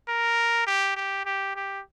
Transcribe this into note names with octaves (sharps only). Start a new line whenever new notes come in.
A#4
G4
G4
G4
G4